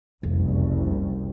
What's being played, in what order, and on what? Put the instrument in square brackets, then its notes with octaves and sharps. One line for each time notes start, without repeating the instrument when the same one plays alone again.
[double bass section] F#1 C2 [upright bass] F2